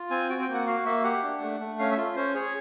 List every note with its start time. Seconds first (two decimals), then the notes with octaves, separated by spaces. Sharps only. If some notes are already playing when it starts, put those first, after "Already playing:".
Already playing: F4
0.10 C4 G#5
0.29 F#4 G5
0.42 G5
0.48 A#3
0.54 F#5
0.67 F#4 F5
0.85 A#3 E5
1.04 G4 F#5
1.23 D4
1.42 A3
1.60 A3
1.79 C#4 F5
1.91 E5
1.97 F4
2.16 C#4 C5
2.35 G#4 C#5